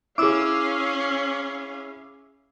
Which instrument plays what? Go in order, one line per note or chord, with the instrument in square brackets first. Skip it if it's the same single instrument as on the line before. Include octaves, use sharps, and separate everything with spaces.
[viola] C#4 F5 [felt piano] E4 G#4 [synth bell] D6 E6